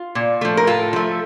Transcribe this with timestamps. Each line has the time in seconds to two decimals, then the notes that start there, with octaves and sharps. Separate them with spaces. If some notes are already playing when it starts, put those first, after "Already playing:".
Already playing: F4
0.15 A#2
0.41 F3 A3
0.57 A#4
0.67 A2 F4 A4
0.93 F3 A3